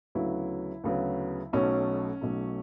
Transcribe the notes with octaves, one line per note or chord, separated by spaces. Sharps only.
D2 C#3 F#3 B3 E4
D2 C#3 F#3 B3
B1 B2 F#3 A3 C#4
B1 B2 F#3 A3